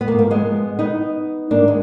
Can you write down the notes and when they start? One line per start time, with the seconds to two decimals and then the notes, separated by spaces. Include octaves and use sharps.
0.01 B3
0.07 F3 A#3
0.12 G#2
0.19 A#3
0.31 G#3 B3
0.79 B3 D#4
1.50 G#2 D#3 A#3 D4
1.68 G#3